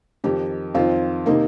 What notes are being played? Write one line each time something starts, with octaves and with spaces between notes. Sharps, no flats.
F2 D#3 D#4 G4
F2 D#3 C4 F4
C3 D#3 A#3 D#4